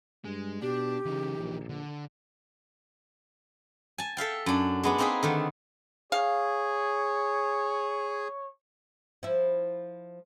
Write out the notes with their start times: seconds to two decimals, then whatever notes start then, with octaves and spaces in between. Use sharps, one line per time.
0.25 G2 G#3
0.62 B2 D4 G4
1.06 C#3 E3 D#4
1.39 A#1
1.69 D3
3.98 G#5 A5
4.17 A4 E5 F5 G5
4.46 F#2 D4
4.83 G#3 B3 D4
4.98 A#3 C4 D#4 G#4 B4
5.23 D3 D#3 A3
6.12 G#4 C#5 F5
9.23 F3 E4